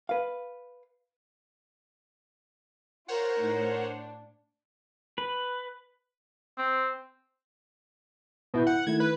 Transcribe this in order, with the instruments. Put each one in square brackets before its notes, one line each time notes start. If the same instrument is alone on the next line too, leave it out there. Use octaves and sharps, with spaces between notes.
[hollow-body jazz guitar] B4 F5
[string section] F4 [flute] A#4 [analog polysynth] C5 C#5 F#5
[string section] A2 D#4
D4
[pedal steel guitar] B4
[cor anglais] C4
[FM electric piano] G#1 E4 G6 [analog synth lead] B2
[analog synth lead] F#5
[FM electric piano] D#3 A3 E4 [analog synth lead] G#6
[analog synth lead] B4